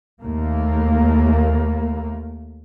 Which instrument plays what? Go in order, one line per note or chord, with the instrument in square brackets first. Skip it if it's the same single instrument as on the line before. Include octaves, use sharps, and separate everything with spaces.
[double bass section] D#2 A3 A#3